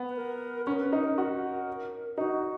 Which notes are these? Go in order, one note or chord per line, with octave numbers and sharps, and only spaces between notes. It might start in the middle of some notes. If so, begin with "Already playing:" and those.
Already playing: B3
B4
A#4
C#4 A#4
B4
D#4 A#4
A#4
F#4
D#4 F#4